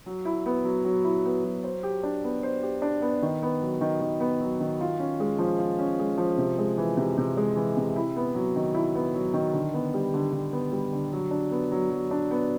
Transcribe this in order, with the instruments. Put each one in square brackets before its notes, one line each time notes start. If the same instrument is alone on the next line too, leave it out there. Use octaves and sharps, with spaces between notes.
[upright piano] F#3
E4
B3
F#3
F#3
E4
B3
F#3
C5
G4
D4
B3
C5
G4
D4
B3
D#3
B3
F#3
D#3
D#3
B3
F#3
D#3
F4
C#4
G#3
F3
F4
C#4
G#3
F3
C3
G#3
E3
C3
C3
G#3
E3
C3
E4
B3
F#3
D#3
E4
B3
F#3
D#3
D3
B3
G3
D3
D3
B3
G3
D3
F#3
D4
B3
F#3
F#3
D4
B3